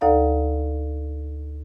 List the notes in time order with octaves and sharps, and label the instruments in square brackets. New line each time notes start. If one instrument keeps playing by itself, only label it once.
[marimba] D2 D#4 A4 D5 F5 A#5